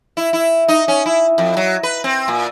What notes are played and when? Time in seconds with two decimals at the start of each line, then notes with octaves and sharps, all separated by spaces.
0.17 E4
0.33 E4
0.68 D#4
0.88 C#4
1.06 E4
1.38 F2
1.57 F#3
1.83 B4
2.04 C4
2.28 A#2